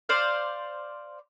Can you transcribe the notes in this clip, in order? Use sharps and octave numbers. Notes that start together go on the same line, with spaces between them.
C5 D5 F5